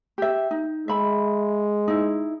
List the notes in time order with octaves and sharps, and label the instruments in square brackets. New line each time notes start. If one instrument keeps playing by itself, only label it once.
[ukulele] G4 E5
D#4
[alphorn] G#3 [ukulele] E5 B5
[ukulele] D#4 E4